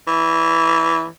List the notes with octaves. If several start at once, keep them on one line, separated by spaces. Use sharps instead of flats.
E3